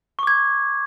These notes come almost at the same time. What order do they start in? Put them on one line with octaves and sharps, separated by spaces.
C#6 D6 G#6